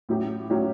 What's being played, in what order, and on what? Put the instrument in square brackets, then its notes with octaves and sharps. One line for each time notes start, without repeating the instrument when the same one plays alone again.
[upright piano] A2 F#3 C#4 G4
A2 F#3 C#4 G4